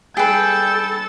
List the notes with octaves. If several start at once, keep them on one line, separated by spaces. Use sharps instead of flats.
G3 D4 G#4 A4 B4 G5 E6 A6